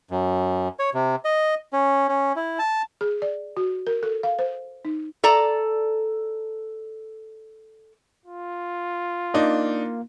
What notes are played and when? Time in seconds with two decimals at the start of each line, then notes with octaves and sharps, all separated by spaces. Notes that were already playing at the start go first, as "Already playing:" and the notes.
0.11 F#2
0.79 C#5
0.94 C3
1.25 D#5
1.73 C#4
2.08 C#4
2.36 E4
2.59 A5
3.01 G#4
3.22 D5
3.57 F#4
3.87 A#4
4.03 A4
4.23 F5
4.39 C5
4.85 D#4
5.24 A4 D5 A#5
8.26 F4
9.34 A#3 D4 D#4